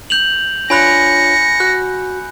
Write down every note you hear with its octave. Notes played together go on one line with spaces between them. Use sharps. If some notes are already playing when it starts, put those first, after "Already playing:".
G6 F7 F#7
D4 F4 C#5 G#5 B5 F#6 A#6 C#7
F#4 F#6